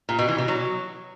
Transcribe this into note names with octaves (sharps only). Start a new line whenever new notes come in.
A#2
B2
E3
B2
F#3